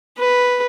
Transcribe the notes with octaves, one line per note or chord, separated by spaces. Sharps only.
B4